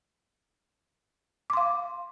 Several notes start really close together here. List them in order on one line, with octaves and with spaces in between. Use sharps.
D6 C6 F5